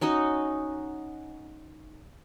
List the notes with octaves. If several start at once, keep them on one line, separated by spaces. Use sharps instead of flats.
C#4 D#4 F#4 D#5